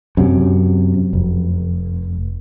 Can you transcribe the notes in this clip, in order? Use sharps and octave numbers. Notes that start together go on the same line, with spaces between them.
F#2 C3
F1